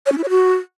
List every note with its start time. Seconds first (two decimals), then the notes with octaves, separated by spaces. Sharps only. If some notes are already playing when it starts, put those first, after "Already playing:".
0.06 C#5
0.12 C#4
0.18 E4
0.24 C#5
0.29 F#4